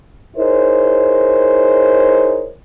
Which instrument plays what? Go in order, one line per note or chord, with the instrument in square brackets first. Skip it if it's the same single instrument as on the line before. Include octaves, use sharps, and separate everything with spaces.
[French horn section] D#4 E4 G#4 A#4 C5 C#5